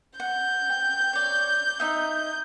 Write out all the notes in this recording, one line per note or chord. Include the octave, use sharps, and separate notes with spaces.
F#5 G6
G5
C#5 D5
D#4 D#5 E5